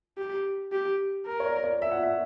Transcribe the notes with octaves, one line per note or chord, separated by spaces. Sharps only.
G4
G4
A#4
C#5
D5
D5
E5
F#5
E5